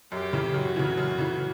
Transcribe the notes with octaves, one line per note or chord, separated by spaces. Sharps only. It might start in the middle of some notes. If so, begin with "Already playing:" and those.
F#2 G4
C#3 E3
F#2 F#4
C#3 E3
F#2
C#3 E3